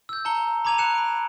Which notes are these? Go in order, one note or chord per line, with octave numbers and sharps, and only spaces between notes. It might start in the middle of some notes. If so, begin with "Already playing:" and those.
E6 G6
A5 A#5 C#7 G7
A#5 B5 D6 G#6 D#7 F7
F#6 C#7 E7
B5 D7